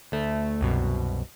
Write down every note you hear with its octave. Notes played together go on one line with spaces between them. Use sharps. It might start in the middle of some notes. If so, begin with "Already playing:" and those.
D2 A3
C2 F#2 B2